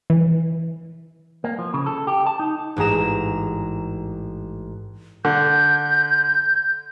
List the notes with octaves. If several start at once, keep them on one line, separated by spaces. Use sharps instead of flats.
E3
A#3
F3
C#3
A4
G4
A5
D#4
A1 G#2 G#4 A#5 E7
D3 G6